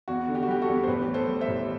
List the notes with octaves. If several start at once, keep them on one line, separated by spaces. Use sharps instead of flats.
E2 F#4
D3
G4
F#4
G3 G4
F#4 A4
E2
C5
A1 G4 B4
A2
A4 C5
G3
C5 E5
A1